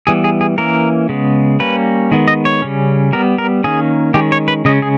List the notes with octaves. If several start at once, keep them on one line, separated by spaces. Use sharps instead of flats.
E3 G3 B3 G#4
G#4
G#4
E3 A#3 C#4 A#4
C#3 G#3 B3
G3 A#3 C#4 B4
D#3 G#3 B3
D#5
C#5
C#3 G3 C#4
G3 B3 A#4
A#4
D#3 A#3 C#4 G#4
D#3 G#3 C#4 G4
C#5
B4
C#3 G#3 C#4 D#5
G#4